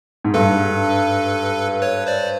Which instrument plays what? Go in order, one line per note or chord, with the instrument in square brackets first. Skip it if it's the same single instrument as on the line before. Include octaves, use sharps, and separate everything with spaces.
[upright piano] G#2
[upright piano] G2 [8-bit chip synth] A4 B4
[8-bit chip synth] B4 C#5
C5 D5